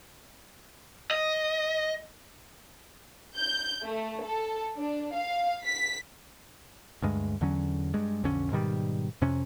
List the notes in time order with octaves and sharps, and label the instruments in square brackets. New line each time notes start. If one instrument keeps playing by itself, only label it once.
[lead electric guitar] D#5
[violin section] G6
A3
A4
D4
F5
B6
[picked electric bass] D2 G2 G#3
E2 D3 F#3 C#4
G2 G#3
B1 F2 D3 C#4
G#2 B2 D#3 G3
F2 C3 C#4